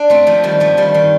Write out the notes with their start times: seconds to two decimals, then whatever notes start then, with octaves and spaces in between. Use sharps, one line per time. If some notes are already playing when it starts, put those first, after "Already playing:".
Already playing: D4
0.10 A3 C4
0.27 F3 A3
0.44 D#3 G3
0.60 F3 A3
0.77 D#3 G3
0.94 D#3